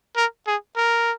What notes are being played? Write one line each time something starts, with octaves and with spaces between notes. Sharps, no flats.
A#4
G#4
A#4